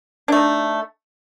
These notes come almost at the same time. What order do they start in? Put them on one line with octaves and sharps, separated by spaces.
D4 A3 D#4